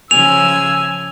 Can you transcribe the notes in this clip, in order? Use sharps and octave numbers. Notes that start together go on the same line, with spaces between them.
C#3 F3 G#5 E6 F7